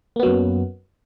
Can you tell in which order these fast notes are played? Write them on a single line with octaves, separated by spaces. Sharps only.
A#3 B3 F#3 F#2